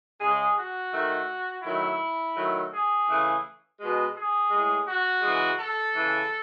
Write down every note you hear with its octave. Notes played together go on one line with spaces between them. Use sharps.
C#3 G#3 G#4
F#4
D#3 A3
D#3 F#3 A3 E4
D#3 F#3 A3
G#4
C#3 E3 A3
B2 G#3
G#4
A2 G#3
F#4
C#3 E3 G#3
A4
C#3 E3 A3